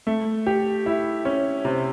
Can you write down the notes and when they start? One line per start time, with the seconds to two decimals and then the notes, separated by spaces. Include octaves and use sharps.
0.07 A3
0.47 G4
0.86 E4
1.25 C#4
1.65 C3